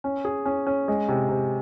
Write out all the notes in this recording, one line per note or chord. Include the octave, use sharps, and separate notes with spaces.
C#4
G#4
C#4
C#4
G#3
C3
C3